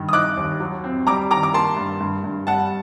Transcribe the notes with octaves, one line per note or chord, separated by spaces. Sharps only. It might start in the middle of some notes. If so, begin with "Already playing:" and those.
Already playing: G2 D#3
D#6
D#4 D6 F#6
D#2
F#3
C4
G3 A#5 D6
D#3 A#5 D6
D6
A#3 A5 C6
G2
G2
G2
G3 F#5 A5